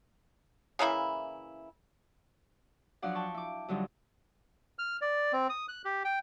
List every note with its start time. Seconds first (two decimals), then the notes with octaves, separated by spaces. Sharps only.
0.79 C#3 E3 A#3 E4
3.02 F3 F#3 D4 D5 F#5
3.15 G5 A5 C#6
3.34 E4 D6
3.68 F2 D3 F#3 G3 D#4
4.79 F6
5.01 D5
5.33 C4
5.50 D#6
5.68 F#6
5.85 G4
6.05 G5